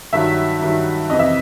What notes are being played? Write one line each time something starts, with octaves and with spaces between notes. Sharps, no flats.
G2 D#3 F#3 E5
G2 D#3 F#3
F2 C3 E3 D#5
E5